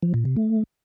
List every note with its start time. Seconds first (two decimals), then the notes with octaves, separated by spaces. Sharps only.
0.03 F3
0.14 A#2
0.25 C3
0.37 A3